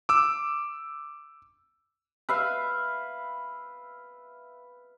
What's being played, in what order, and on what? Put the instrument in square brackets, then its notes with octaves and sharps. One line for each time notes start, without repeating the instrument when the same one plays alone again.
[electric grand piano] D6 E6
[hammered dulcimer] B4 E5 F5